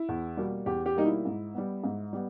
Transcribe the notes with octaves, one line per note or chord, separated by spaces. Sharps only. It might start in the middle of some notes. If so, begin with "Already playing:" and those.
Already playing: E4
E2
B2 G3 A#3
E2 G4
G4
B2 G3 A#3 D#4
E4
G#2
G3 B3
G#2
G3 B3